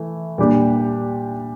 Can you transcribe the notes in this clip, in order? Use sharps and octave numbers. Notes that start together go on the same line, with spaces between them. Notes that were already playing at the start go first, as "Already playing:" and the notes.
Already playing: E3 A3
A#2 G3 D4 G4